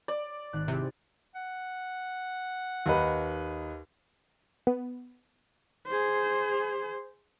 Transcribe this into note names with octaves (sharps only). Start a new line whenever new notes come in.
D5
G#1 F#6
C3 E4 G4 G#4
F#5
D#2 D#4 B4
B3
G#4 C5